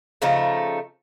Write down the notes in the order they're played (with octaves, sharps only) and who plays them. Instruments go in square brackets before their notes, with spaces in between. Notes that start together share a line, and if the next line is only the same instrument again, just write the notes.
[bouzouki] C#3 F3 A3 D#4